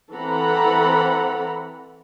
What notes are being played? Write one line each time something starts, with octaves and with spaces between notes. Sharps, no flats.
E3 C4 A4 F#5 A#5 B5